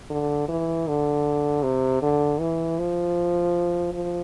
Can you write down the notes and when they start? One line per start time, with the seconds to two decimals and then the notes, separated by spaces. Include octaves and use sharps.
0.10 D3
0.48 E3
0.88 D3
1.63 C3
2.02 D3
2.40 E3
2.79 F3
3.93 F3